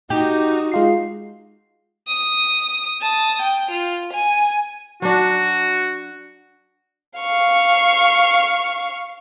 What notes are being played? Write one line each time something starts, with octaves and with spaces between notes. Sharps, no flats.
D#4 F#4 G4
G#3 F4 C7
D#6
A5 D#6
G5
F4
G#5 D#7
F#3 D4 F#4
F5 C#6